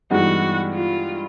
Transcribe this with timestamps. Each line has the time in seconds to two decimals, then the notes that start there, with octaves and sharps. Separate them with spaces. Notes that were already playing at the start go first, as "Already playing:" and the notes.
0.10 G2 E3 G#3 B3 D#4 F#4
0.74 F4